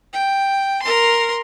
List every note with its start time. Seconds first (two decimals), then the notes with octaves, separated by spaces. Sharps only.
0.13 G5
0.82 A#4 C6